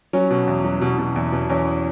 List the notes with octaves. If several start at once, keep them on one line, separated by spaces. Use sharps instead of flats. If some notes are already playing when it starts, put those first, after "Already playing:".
F#3 C#4
B2
E2
F#3
B2
B2
E2
B2
E2 C#4